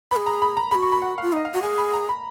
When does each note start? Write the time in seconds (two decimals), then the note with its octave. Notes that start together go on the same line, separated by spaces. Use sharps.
0.11 B4 B5
0.16 G#4
0.26 A#5
0.42 B5
0.57 A#5
0.71 F#4 G#4 B5
0.82 C#6
0.92 B5
1.02 F#5
1.18 F4 F5
1.33 D#4 D#5
1.45 F5
1.54 F#4 F#5
1.62 G#4 G#5
1.78 B5
1.93 A#5
2.09 B5